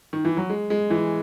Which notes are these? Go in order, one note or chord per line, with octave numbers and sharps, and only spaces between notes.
D#3
E3
F#3
G#3
G#3
E3